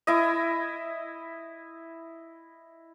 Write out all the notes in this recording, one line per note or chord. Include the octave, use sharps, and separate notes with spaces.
E4 D#5